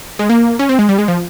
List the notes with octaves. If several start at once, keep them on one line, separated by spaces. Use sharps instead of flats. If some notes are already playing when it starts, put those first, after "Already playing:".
G#3
A#3
C#4
C4
G#3
G3
G#3
F3